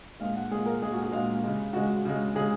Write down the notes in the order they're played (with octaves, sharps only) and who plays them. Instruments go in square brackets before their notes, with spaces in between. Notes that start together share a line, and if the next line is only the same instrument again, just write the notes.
[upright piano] A#2 G#3 F5
F#5
A#2 G#3 G#4
A#4
A#2 G#3 G#4
F#4
G#4
A#2 G#3 F5
C#3 G#3
C#3 G#3 F#4
C#3 G#3
C#3 G#3 G#4